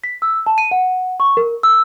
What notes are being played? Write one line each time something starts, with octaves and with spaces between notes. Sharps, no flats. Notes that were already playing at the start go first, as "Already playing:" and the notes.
B6
E6
A5
D#7
F#5
C#6
A#4
E6